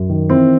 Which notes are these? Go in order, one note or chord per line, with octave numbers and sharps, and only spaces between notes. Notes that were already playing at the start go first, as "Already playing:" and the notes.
Already playing: F#2
D#3
E3 C4